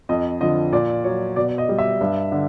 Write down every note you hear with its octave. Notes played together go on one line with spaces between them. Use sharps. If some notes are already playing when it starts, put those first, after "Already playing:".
F2 D#5
D3 F3 D#5
A#2 D5
F#3 C#5
B2 D5
D#5
G3
E5
G2
D3